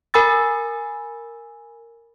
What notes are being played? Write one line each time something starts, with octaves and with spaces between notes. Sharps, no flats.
A#4 G#5 B5 E6 A6